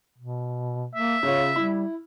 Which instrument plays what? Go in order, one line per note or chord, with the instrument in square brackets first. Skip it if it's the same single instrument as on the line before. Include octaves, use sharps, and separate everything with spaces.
[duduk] B2
[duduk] A#3 [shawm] E5
[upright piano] C#3 F4 [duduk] C#5
[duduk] G3 [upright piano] E4